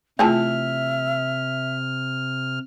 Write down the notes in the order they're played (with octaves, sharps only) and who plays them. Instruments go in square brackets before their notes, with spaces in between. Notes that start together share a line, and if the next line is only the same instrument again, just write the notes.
[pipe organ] C3 F6 [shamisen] E3 G#4 A5 [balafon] A3 F4 [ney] E5